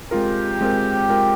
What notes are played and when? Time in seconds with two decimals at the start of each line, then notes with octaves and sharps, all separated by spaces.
0.11 G#3 C4 F4 G4 A#4
0.61 G#3 C4 F4 A#4
1.09 G#3 C4 F4 A#4